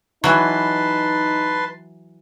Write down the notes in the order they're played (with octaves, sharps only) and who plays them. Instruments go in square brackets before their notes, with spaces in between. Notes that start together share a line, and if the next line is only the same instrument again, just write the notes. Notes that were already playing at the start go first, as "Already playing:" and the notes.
[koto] E3 F#3 [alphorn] D#4 [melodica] B4 A5 C6